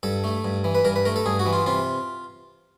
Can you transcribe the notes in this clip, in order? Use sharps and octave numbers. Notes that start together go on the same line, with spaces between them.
G2 A4
A3
G2
E3
B4
G2 A#4
B4
A3 A#4
A4
G2 G#4
F#4
E3
F4
C3 F4